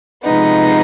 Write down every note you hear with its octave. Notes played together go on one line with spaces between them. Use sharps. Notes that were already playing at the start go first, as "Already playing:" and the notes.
C3 F3 G#3 B3 D#4